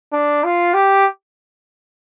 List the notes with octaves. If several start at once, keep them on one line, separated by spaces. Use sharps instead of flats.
D4
F4
G4